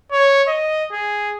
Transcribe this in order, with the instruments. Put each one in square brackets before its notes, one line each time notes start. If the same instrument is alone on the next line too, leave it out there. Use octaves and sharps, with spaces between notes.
[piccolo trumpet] C#5
D#5
G#4